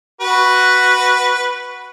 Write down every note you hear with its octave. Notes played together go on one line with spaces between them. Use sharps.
F#4 B4